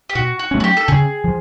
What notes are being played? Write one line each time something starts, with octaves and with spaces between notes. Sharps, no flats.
G4
B2 F#4
F#4
F#3 A3 C#4
F#4
G4
A4
C#3 G#4
F3